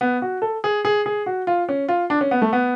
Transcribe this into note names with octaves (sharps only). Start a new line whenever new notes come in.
B3
F#4
A4
G#4
G#4
G#4
F#4
F4
C#4
F4
D4
C#4
B3
A3
B3